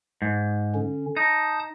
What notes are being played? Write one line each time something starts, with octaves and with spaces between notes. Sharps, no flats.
G#2
D3 C#4
D#4 A5 D#6 G6